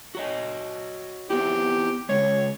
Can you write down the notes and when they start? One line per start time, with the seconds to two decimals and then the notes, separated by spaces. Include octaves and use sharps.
0.15 F#4 C#5 D#5
1.30 B3 C4 E4 G4
2.09 C#3 G#3 C#5